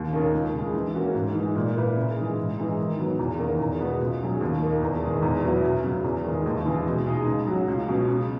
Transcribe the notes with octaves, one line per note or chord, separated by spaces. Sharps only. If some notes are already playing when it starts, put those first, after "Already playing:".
Already playing: D#2
D#3 A#3 C#4
C#2
C#3 G#3
E3
A#3 C#4 F#4
G#2
E3 G#3
A#2
A#3 E4 B4
C#3
E3 G#3
G#2
E3 G#3 D#4
D#3
F#3 B3
E2
D#3 A#3 C#4
E2
B2 G#3 B3 F#4
C#2
B2 F#3 C#4 G#4
D#2
D#3 A#3 D#4
E2
D#3 G#3
E2
B2 F#3 B3 E4
F#2
C#3 F#3
E2
D#3 G#3
D#2
C#3 E3 G#3
B2
G#3 D#4
C#3
F#3 C#4 F#4
C#2
B2 F#3 C#4
C#3